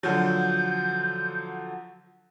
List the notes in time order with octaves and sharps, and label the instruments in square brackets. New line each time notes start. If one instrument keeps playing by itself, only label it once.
[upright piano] D3 F3 F#3 [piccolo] G6